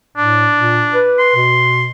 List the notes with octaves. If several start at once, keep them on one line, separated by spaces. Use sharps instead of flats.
A2 D4
A#2
B4
C6
B2